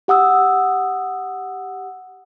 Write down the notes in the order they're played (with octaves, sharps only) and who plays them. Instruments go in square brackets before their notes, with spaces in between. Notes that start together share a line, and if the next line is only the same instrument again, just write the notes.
[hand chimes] G4 F#5 D#6 E6